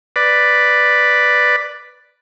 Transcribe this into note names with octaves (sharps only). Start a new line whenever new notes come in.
B4 D5